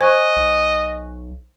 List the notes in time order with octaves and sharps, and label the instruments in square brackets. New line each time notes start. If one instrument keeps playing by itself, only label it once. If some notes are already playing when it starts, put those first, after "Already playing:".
[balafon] C5 [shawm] D#5 [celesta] G#5 C#6 F#6
[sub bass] B1